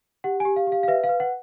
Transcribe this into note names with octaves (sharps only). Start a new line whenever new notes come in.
G4 F#5
G4 G#5
F5
G4
F5
F5
B4 E5
F5
B4
F#5